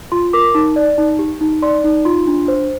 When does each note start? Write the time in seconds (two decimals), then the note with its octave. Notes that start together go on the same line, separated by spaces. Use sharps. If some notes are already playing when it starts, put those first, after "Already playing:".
0.12 F4 C6
0.33 A#4 D6
0.55 D#4
0.76 D5
0.98 D#4
1.19 G4
1.41 D#4
1.62 D5 C6
1.84 D#4
2.05 F4 C6
2.27 D4
2.48 C5